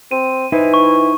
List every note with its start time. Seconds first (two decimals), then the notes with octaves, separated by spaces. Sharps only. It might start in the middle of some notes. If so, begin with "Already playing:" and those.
0.11 C4 D#7
0.52 E3 D#4 E4 C5
0.74 C#6